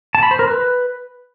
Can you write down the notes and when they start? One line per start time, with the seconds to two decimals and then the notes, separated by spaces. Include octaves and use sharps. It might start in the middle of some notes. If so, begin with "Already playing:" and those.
0.15 A5
0.23 B5
0.31 C5
0.39 A#4
0.47 B4